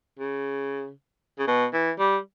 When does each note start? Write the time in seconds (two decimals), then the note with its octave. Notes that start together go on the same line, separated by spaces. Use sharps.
0.19 C#3
1.39 C#3
1.48 B2
1.73 E3
1.99 G3